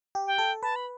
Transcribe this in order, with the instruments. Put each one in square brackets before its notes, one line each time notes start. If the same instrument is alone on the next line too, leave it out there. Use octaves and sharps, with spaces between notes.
[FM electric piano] G4
[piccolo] G5
[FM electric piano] A4
[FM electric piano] B4 [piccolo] A5
[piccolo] B5